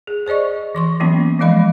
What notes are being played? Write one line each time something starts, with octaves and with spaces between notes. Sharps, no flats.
G#4
G#4 C5 D5 D#5 C#6
E3 C6 C#6
E3 F#3 A#3 B3 C#4
E3 F3 G#3 D#5 B5